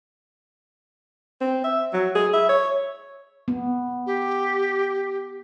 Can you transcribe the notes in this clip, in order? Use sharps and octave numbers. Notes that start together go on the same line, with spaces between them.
C4
E5
F#3
G#4
E5
C#5
B3
G4